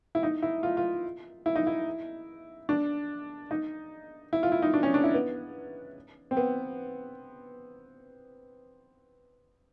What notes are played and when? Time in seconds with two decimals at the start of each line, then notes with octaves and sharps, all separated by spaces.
0.15 E4
0.23 D#4
0.42 E4
0.63 F4
0.77 F4
1.46 E4
1.56 D#4
1.67 E4
2.69 D4
3.51 D#4
4.33 E4
4.43 F4
4.52 E4
4.62 D#4
4.74 D4
4.83 C#4
4.94 D4
5.04 E4
5.14 B3
6.31 C4
6.37 B3